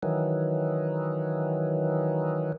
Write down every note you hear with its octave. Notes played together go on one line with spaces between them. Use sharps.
D#3 E3 F#3